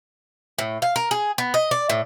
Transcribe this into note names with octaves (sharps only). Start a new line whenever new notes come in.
A2
F5
A#4
G#4
B3
D#5
D5
A2